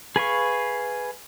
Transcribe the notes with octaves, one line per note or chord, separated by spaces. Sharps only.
G#4 B4 F5 C#6